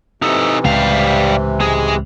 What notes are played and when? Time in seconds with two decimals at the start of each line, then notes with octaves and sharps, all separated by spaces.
0.22 C3 E3 D#4 A4
0.65 C#2 A2 G3 F5
1.60 G#3 G#4